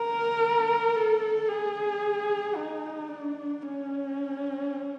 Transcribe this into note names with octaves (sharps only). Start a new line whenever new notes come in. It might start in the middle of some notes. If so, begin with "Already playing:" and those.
Already playing: A#4
A4
G#4
D#4
D4
C#4